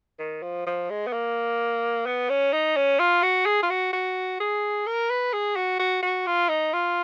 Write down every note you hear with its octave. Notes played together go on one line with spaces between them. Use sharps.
D#3
F3
F3
G#3
B3
A#3
B3
C#4
D#4
C#4
F4
F#4
G#4
F4
F#4
F#4
G#4
A#4
B4
G#4
F#4
F#4
F#4
F4
D#4
F4